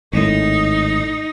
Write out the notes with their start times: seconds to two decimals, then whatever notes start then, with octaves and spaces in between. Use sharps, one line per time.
0.13 G#1 A2 D#4